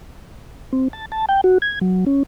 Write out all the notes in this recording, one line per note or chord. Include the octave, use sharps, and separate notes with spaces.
C4
A5
A5
G5
F#4
G#6
F#3
C#4